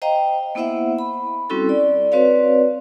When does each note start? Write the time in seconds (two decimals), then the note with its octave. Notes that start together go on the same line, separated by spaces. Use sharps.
0.02 C5 D#5 F5 G5 A#5
0.55 A#3 B3 E4 C5 E5 F#5
0.99 B5
1.50 G3 C4 C#4 E4 F#4 A4
1.69 D5
2.12 C4 F#4 B4 C#5 D5 F5